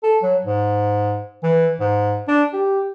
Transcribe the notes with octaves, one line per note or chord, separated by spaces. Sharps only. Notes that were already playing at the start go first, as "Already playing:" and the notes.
A4
F#3
G#2
E3
G#2
D4
G4